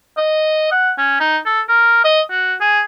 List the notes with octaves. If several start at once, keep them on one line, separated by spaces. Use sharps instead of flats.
D#5
F#5
C#4
D#4
A4
A#4
D#5
F#4
G#4